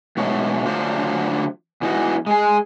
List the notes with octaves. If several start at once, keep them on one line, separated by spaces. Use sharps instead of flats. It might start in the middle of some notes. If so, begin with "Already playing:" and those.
G#2 B2 A3 C#5
D3 F#3 A3 D4 F4 C5
E2 E3 D#4 F#4
G#3 G#4